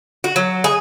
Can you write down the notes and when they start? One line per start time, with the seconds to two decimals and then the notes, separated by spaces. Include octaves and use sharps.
0.24 F#4
0.36 F#3
0.64 G#4